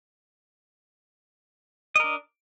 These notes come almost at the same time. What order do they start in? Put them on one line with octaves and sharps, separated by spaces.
D#5 A#4 D4